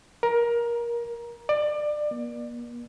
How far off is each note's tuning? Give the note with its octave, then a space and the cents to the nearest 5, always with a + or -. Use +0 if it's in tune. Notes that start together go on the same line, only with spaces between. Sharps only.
A#4 +20
D5 +25
A#3 +45